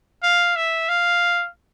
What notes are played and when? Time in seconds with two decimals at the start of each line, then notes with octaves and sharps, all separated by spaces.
0.23 F5
0.56 E5
0.89 F5